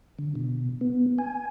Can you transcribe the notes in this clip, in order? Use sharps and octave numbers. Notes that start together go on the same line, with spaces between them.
D3
B2
B3
G#5